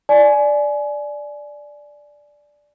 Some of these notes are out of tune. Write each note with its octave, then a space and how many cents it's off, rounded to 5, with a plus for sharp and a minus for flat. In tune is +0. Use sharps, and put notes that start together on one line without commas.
D5 +0 G#5 +25